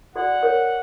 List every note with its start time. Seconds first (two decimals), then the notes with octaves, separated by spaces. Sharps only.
0.15 F#4 A4 D5 F#5
0.43 A#4 C#5